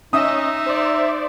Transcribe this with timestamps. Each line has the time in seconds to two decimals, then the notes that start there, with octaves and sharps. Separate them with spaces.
0.13 C#4 D#4 D#5 E5 D#6
0.66 C5 D5